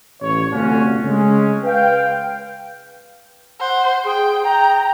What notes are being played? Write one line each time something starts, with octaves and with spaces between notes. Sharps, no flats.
A1 C#5
G1 C3 A3 C#4 F4 F#4
C#3 G#3 C#4
B4 F5 G5
C5 F#5
G#4 G5
G5 A#5